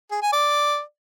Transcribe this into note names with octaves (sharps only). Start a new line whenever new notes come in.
G#4
G#5
D5